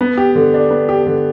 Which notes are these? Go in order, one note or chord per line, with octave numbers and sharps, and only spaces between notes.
B3
G4
D3
D4
B3
G4
D3